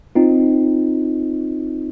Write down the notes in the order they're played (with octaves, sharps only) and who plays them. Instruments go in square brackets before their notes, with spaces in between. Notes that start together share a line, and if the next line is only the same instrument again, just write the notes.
[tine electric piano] C4 D#4 F4